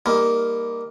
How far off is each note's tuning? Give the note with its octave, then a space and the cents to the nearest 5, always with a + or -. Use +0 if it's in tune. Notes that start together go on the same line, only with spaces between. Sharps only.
G3 +25 A#3 +0 D#4 +15